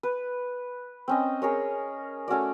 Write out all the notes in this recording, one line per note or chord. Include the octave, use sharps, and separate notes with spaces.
B4
C4 C#4 D#5
G#4 A#4 C#5
A3 C#4 F#4 D5